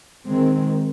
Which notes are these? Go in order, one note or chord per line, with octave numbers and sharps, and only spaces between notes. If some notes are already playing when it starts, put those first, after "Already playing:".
D#3 G#3 C4